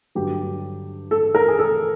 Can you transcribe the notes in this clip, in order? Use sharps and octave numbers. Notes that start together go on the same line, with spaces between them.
G2 D3 F#3 G4
A4
A#4
G#4
A4